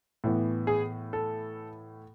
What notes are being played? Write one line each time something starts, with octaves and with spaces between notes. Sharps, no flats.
A2 E3 B3
G#4
A4